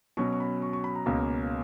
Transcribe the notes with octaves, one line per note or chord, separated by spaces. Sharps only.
B2 F#3 C#4 C#6
C#6
B5
C#6
C#6
B5
A#5
C#2 B2 A#3 C#4